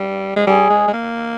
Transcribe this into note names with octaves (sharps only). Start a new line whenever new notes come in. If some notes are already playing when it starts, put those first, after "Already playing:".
Already playing: G3
G#3
G3 G#4
G#3
G#3
A#3